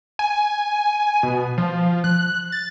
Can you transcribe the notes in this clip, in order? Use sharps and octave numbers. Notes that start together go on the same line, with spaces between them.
G#5
B2
F3
F#6
A6